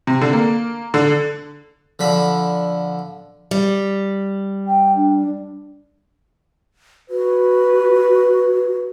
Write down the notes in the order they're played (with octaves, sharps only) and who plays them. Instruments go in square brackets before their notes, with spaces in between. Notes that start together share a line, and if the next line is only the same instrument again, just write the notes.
[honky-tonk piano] C3
D3
A#3
D3
[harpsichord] D3 F3 B5
[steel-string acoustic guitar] G3
[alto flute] G5
D4
[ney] F#4 [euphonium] B4